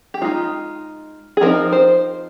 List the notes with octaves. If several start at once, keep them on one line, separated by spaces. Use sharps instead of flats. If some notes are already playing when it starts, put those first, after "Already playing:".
G4
G#3 D#4 F4
G#4
F3 C4 D#4 A#4
C5